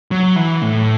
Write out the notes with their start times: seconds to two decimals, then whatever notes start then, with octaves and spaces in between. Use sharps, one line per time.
0.11 F#3
0.36 E3
0.62 A2